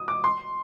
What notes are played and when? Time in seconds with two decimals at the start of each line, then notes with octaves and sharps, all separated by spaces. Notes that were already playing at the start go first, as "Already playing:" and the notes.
Already playing: D#6
0.08 D6
0.24 C6